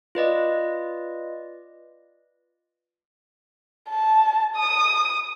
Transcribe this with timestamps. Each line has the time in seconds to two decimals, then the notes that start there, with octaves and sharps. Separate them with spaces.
0.15 F4 B4 D5 D#5
3.90 A5
4.55 D#6